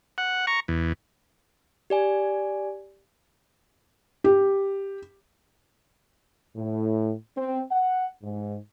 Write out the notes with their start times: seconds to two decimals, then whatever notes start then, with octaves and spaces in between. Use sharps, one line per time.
0.18 F#5
0.47 A#5 C#6
0.68 E2
1.90 G4 D5 G#5
4.24 G4
6.56 A2
7.37 C4
7.72 F#5
8.23 G#2